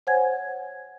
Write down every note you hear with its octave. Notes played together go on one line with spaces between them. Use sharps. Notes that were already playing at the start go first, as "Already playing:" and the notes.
C5 C#5 F#5 G#5 G#6